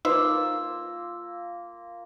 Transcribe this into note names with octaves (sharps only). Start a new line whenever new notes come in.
A#3 D#4 F4 B4 C5 E6